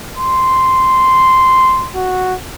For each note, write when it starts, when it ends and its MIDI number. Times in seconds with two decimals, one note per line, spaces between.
0.18 1.89 84
1.96 2.35 66